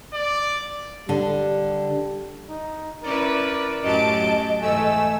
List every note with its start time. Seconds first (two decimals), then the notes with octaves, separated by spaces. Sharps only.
0.14 D5
1.09 D3 G3
2.49 D#4
3.03 C#4 E4 A#4 B4 D5
3.83 F#2 A2 F#3 G4 D#5 A5 D7
4.61 E2 G#2 A3 G#5 E6